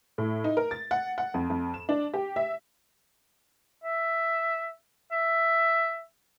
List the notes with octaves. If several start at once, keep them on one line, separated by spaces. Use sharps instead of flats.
A2
D#4
A#4
A6
F#5
F#5
F2
F2
E7
D4
G4
E5
E5
E5